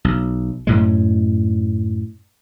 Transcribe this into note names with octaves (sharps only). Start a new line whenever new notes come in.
B1
F#2 A2 G#3